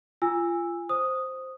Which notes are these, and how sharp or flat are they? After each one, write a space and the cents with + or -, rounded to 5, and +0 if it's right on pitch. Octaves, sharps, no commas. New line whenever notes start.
F4 -25 G#5 -20 E6 +0
C5 +0 D#6 +0